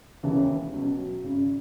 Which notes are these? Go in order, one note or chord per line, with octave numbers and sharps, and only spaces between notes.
E1 D#2 C#3 E3
C#2 B2 F#3
G#1 F#2 C#3